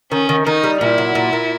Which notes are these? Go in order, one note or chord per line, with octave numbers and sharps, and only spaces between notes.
D#3 C#4
D#3
D#3 D#4
G3
A#2 E4
F#3
A#2
A#2